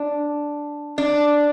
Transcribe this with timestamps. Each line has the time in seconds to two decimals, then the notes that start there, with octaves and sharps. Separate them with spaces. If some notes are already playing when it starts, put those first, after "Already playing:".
Already playing: D4
0.98 D4